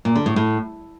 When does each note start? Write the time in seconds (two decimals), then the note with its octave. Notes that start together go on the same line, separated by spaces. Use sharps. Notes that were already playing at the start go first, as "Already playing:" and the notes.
0.05 A#2
0.15 D3
0.26 A2
0.36 A2